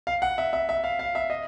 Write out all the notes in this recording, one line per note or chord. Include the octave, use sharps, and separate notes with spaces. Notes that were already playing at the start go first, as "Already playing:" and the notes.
F5
F#5
E5
E5
E5
F5
F5
E5
D#5